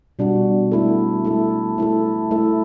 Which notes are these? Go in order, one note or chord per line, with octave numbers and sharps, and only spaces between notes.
B2 G3 D4 F#4
A3 E4 A4
A3 E4 A4
A3 E4 A4
A3 E4 A4